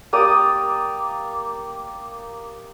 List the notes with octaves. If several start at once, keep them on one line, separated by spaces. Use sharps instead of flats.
A#3 G4 D5 D#6